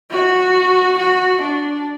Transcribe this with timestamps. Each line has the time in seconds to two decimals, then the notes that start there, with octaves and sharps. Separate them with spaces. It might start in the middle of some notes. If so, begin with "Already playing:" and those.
0.11 F#4
0.97 F#4
1.41 D4